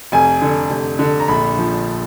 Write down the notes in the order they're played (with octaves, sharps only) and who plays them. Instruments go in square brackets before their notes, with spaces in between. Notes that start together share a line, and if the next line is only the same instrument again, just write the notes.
[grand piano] F1 G#5
D3
F1
D3
A#5
A#1 B5
F3